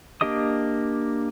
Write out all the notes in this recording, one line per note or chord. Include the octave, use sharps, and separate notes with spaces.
A#3 D4 G4 D#5 D#6